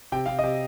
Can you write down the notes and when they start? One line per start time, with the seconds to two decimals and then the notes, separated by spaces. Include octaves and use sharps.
0.12 C3 G5
0.26 C3 F5
0.39 C3 D#5